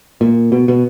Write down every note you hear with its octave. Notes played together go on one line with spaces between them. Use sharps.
A#2
B2
B2